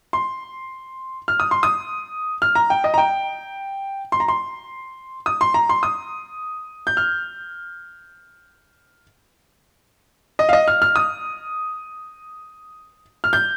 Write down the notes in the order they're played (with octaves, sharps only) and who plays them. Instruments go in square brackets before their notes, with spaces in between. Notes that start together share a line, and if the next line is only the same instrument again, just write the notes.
[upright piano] C6
F6
D#6
C6
D#6
F6
A#5
G5
D#5
A#5
G5
C6
A#5
C6
D#6
C6
A#5
C6
D#6
G6
F6
D#5
F5
D#5
F6
F6
D#6
F6
G6